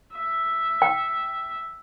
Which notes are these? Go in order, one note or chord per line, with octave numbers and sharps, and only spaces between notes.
E5
G5